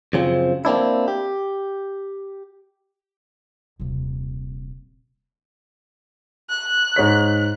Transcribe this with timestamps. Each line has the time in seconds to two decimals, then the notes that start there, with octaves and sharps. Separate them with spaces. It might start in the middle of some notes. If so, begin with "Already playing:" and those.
0.13 F#2 C#3 F3 C4
0.65 A#3 C4 D4 E4
1.08 G4
3.80 D#1 C3
6.50 F#6
6.96 G#2 C#5 B6